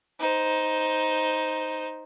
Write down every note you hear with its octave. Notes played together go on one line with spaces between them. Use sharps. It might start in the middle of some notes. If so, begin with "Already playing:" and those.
D#4 C5